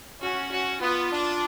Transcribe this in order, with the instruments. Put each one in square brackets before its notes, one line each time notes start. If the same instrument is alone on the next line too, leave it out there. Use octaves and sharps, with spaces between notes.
[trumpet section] C#4 [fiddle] F#4
[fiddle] F#4
[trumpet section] B3 [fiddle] F4
[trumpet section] D4